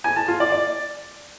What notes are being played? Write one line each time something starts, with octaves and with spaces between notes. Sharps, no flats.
G#5
A5
F4
D5
D5